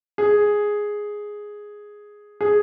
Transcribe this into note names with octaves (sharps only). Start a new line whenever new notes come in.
G#4
G#4